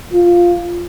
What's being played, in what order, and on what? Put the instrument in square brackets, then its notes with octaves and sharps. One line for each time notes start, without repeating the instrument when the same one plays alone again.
[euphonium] F4